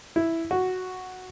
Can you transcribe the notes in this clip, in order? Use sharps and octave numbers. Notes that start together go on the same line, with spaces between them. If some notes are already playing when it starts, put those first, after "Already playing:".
E4
F#4